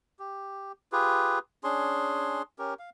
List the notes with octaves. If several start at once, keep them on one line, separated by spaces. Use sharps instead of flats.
G4
F4 G4 G#4 B4
C#4 D4 G#4 C6
C#4 G4 A#4
F5